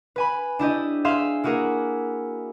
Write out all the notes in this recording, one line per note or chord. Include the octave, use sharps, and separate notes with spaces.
B4 G#5 B5
D4 E4 G4 D#5
G#4 E5 F5 C6 F6
A#3 E4 F#4 G#4 A#4